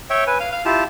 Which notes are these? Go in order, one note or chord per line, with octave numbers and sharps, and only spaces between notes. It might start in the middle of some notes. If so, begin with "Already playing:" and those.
C#5 E5 G5
B4 G#5
F5
F5
E4 F4 G4 A5